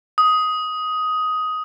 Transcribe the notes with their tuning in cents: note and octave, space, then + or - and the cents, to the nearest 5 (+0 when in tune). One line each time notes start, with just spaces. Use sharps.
D#6 +10